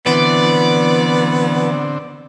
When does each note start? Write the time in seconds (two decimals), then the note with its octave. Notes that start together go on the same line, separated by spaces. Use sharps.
0.06 D3 E3 B3 C4 D5